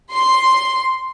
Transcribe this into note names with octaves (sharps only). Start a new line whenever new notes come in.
C6